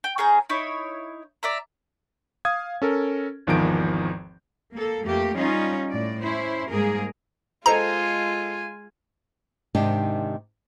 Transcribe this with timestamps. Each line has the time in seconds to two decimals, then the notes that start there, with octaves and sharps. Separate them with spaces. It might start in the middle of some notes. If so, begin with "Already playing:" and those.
0.04 G5
0.18 C#4 G#4 A#5 G6
0.50 D#4 E4 C#5
1.43 D5 E5 A#5
2.45 F5 D#6 G#6
2.82 C#4 A4 A#4
3.47 G#1 E2 D#3 F3 G6 D7
4.75 A#3 A4
5.04 F2 A3 A#3 G4
5.36 G3 C#4 D#4 F4
5.90 A2 D5
6.22 C#4 E4 C5
6.69 G#2 G3 A#3 G#4 A#4
7.66 G#3 F4 A4 C5 D#5 G#5 A#5
9.75 G#2 C3 D#3 D4 D#4 G4